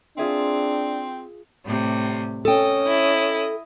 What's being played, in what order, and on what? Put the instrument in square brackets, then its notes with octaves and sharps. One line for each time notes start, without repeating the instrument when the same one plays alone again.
[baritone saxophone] C4 [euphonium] D4 [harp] F4 G#4 E5
[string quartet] A2 C3 G3
[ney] C#4 [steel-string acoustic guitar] A4 G5 [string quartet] D#5
[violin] E4